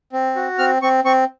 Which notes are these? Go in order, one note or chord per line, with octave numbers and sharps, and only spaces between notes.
C4
F#4
C4 F6
C4 C#6
C4 C#6